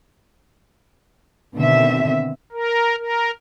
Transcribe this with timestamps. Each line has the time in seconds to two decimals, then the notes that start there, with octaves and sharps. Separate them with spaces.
1.56 B2 D3 D#3 C4 E5
2.52 A#4
2.97 A#4